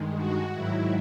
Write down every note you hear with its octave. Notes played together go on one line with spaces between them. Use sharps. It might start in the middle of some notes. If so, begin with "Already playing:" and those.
Already playing: G2 D#3 G#3
F#4
G#2 D#3 F#3 E4